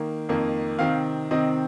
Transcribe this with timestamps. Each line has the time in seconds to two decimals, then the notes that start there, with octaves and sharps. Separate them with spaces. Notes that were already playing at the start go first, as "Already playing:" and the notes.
Already playing: D#3 A#3
0.29 F2 D#3 A#3
0.79 C3 D#3 C4 F5
1.31 C3 D#3 C4 D#5